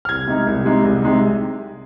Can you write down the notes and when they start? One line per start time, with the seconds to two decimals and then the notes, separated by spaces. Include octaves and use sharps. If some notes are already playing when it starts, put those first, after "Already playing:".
0.05 F6
0.09 C2 G#6
0.28 C3 G#3 D#4
0.47 C2
0.65 C3 G#3 D#4
0.83 C2
1.03 C3 G#3 D#4